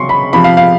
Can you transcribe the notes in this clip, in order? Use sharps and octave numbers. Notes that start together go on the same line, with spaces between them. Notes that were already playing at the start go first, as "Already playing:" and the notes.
Already playing: C#3 F#3 C6 C#6
B5
C3 F3 B5
F5
F5